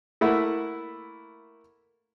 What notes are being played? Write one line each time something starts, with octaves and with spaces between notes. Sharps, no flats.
A3 A#3 E4 F#5